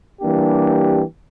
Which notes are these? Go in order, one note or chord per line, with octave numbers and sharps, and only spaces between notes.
E3 G3 A#3 D4 G4